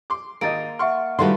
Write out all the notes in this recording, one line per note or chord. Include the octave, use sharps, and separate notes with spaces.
C6 D6
G#1 A#3 D#4 D#5 A6 D7
E5 F#5 C6 C#6 F6
A2 D#3 G3 A3 F#4 B4 F5 C6